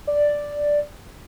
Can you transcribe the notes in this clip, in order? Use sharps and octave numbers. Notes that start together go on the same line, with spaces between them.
D5